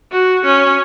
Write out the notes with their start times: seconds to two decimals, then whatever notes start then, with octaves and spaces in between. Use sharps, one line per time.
0.12 F#4
0.45 C#4